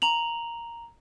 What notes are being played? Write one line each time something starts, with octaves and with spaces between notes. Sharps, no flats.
A#5 F7 F#7